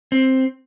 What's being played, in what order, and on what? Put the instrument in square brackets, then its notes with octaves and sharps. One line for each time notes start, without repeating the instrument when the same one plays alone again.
[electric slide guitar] C4